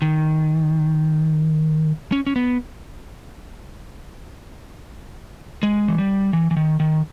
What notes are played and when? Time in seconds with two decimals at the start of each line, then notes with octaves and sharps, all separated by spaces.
0.02 D#3
2.12 C#4
2.27 C#4
2.36 B3
5.63 G#3
5.88 E3
5.98 G3
6.33 E3
6.51 E3
6.57 D#3
6.80 D#3